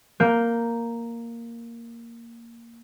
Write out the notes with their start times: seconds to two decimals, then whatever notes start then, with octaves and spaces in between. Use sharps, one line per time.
0.20 A#3 G6